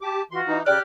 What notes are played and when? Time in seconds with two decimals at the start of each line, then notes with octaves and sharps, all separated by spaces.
0.01 G4 A5 D6
0.31 E3 F4 F#4 C6
0.47 E3 D#4
0.66 C#3 G4 D5 G5 F6 F#6